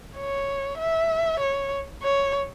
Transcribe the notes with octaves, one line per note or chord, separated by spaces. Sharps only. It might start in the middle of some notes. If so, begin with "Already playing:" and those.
C#5
E5
C#5
C#5